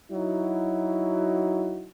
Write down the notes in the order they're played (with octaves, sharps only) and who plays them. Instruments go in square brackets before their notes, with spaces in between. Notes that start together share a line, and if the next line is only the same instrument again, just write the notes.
[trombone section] F#3 D#4 E4 F#4